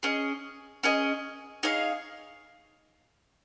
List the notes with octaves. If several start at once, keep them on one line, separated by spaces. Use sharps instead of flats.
C#4 G#4 D#5
C#4 G#4 D#5
D#4 G#4 C#5 F5